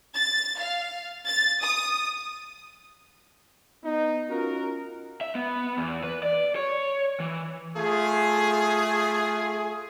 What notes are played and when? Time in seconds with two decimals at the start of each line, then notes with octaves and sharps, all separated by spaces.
0.15 A6
0.60 F5
1.26 A6
1.62 D#6
3.85 B3 D#4
4.30 C#4 F4 F#4 A#4
5.21 E5
5.35 B3
5.77 E2
6.04 B4
6.23 D5
6.56 C#5
7.20 E3
7.77 A3 F4 G#4